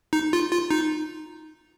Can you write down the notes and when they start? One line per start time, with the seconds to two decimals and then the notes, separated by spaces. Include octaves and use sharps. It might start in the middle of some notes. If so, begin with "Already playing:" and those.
0.13 D#4
0.33 F4
0.52 F4
0.71 D#4